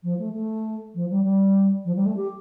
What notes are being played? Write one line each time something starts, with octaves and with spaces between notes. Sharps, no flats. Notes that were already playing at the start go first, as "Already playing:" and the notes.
F3
A3
A3
F3
G3
G3
F3
G3
A3
G4